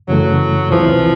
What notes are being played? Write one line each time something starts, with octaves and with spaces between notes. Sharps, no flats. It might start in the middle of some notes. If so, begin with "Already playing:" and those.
F#2 C#3 E3 F#3 A3
C#2 C3 E3 F3